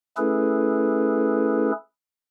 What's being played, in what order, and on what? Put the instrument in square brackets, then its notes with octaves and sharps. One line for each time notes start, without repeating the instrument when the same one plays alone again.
[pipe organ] A3 C#4 E4 G#4 A4 B4